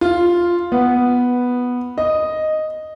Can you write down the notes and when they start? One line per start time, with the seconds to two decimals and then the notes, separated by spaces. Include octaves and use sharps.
0.01 F4
0.72 B3
1.98 D#5